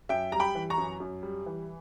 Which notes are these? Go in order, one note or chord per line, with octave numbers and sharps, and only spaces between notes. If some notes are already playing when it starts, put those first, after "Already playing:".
F#2 E5 G5
G3 A#5
G5 B5
E3
A#5 C#6
F#2
F#2
G3
E3